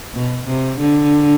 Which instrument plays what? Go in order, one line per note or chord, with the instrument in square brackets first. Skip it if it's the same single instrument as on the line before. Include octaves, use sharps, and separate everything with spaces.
[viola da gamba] B2
C3
D3